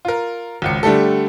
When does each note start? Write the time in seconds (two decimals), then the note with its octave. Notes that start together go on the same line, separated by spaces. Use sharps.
0.05 F4 A#4
0.62 G#1 C#2 C#7
0.83 D3 G3 A3 G4 A4